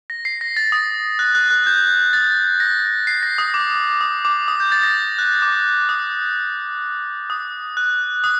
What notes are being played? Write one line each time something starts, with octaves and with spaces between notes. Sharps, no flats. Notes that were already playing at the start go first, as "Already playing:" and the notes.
A#6
C7
A#6
A6
D#6
F#6
F#6
F#6
G6
A6
A#6
C7
A#6
D#6
D6
D#6
D6
D#6
G6
A6
A#6
F#6
D6
D#6
D#6
F#6
D#6